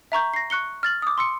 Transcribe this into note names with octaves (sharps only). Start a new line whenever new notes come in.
E5 A#5 C#6 G6
A#6 C7
C#6 F#6 C#7 G7
F6 A6 F#7
D6 D#6
C6 E6 C#7